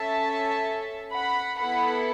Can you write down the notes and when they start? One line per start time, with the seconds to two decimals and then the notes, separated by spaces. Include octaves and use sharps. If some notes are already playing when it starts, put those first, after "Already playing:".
Already playing: C#4 A4 E5 A5
1.13 F#5 B5
1.58 B3 E4 A4 F#5 B5